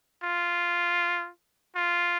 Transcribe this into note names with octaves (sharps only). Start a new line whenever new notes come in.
F4
F4